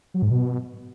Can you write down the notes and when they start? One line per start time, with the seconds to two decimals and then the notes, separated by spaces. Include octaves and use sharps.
0.14 F#3
0.22 G#2
0.30 B2